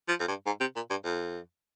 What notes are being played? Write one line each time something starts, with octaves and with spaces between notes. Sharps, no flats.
F3
F2
G2
G#2
C3
A#2
G2
F2